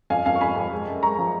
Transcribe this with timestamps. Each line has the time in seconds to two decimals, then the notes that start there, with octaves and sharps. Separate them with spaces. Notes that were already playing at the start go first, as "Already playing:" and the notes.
0.10 F2 F5 G#5
0.26 F2 F5 G#5
0.36 C#6
0.41 F2 G#5 B5
0.56 F2
0.72 G#3
0.88 F#2
1.03 G#3 A#5 C#6
1.19 F3